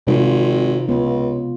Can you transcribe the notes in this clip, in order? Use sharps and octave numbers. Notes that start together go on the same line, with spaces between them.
G#1 C3 G#3 F4
C#2 B3 F4